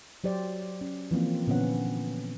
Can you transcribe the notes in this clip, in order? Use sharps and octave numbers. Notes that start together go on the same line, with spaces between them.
F#3 G4 C5 D5
C#4
E3 F3 A#3 C4
A#2 D3 B3 C#4 F#5